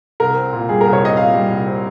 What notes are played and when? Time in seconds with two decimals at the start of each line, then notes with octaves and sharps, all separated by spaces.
0.20 C2 A#4
0.36 C4
0.53 A#2
0.69 G3 G#4
0.81 C2 A#4
0.93 C#5
1.01 C4 D#5
1.17 A#2 F5
1.34 G3
1.50 C2
1.67 C4